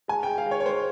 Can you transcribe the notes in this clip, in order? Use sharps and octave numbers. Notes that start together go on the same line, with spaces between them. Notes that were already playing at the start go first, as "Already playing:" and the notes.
G#3 G#5
G#3 G5
F5
G#3 C#5
C#5
G#3 C5